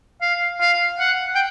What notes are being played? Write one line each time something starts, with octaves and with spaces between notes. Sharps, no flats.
F5
F5
F#5
G5